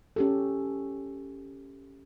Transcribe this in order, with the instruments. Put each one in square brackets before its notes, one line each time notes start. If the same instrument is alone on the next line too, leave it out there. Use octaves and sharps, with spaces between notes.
[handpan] C#4 G4 A4